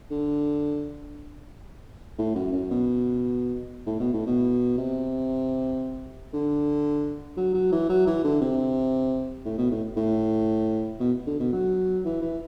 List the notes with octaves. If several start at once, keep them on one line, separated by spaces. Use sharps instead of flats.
D3
A2
F#2
F#2
B2
A2
B2
A2
B2
C3
D3
F#3
F#3
E3
F#3
E3
D3
C3
A2
B2
A2
A2
B2
D3
B2
F#3
E3
E3